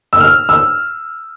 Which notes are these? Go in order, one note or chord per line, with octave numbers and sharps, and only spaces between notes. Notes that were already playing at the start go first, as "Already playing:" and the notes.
E6
F6
E6